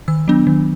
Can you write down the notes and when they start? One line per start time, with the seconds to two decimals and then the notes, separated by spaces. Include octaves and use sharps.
0.08 D#3 E6
0.28 F#3 B3 D4
0.47 D#3